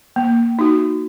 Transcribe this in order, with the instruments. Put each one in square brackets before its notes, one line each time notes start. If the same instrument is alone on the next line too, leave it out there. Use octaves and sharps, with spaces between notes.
[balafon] A#3
D#4 F#4